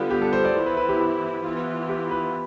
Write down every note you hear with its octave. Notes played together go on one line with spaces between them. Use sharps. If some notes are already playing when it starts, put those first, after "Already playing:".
Already playing: D3 G3 B3 F4
G4
A4
C5
D5
E3 B3 E4 C5
B4
B4
G4
G4
E3 B3 F4
G4
B4